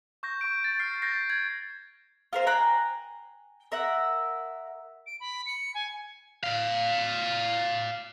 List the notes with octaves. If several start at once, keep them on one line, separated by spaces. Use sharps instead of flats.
C#6 G6 A#6
C#6 G6 D7
A6
F6 C7
G6 A6 A#6 C7
G#6
F4 A#4 C5
G5 G#5 A#5 F#6
A#4 E5 F#5
D7
B5
C#7
G#5
D5 F5